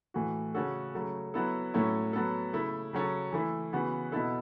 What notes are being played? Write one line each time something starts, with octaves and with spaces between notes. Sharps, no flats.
A2 E3 A3 F#4
C#3 A3 C#4 F#4 A4
C#3 F#3 A3
F#3 B3 E4 A4
A2 F#3 A3 C#4 E4
F#3 B3 A4
C#3 A3 E4
C#3 F#3 C#4 A4
E3 A3 E4
C#3 E3 B3 F#4
B2 B3 E4 A4